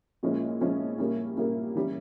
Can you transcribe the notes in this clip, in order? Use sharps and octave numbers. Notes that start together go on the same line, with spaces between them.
A#2 F3 G#3 C#4 E4
A#2 F3 G#3 C#4 E4
A#2 G3 A#3 C#4 E4
A#2 G3 A#3 C#4 E4
E3 G3 C#4 E4